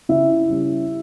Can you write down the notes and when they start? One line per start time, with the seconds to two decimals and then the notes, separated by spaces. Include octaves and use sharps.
0.09 C#3 E4 E5
0.49 G3 C#4